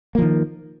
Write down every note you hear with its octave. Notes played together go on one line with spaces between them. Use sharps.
D#3 F3 A#3